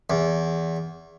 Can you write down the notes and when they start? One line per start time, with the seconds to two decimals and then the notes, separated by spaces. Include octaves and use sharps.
0.10 E2